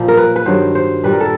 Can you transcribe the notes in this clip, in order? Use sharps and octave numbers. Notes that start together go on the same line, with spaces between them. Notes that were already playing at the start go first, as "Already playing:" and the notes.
Already playing: A#2 F3
A#4
B4
B4
G2 D#3 F#3 C5
C5
A#2 G3 B4
A#4
A4